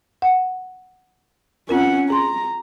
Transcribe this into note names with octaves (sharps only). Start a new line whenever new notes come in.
F#5
C4 C#4 F4 A#4 F#5
G#4 A#5 C6